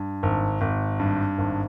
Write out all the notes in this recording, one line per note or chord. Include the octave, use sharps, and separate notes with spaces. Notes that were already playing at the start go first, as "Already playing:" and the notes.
Already playing: G2
G#1
G#1
G2
G#1